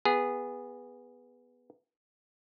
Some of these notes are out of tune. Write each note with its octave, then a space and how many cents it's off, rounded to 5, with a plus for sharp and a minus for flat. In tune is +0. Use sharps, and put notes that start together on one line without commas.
B3 +0 G#4 -20